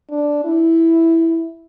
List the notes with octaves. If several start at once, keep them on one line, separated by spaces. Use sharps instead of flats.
D4
E4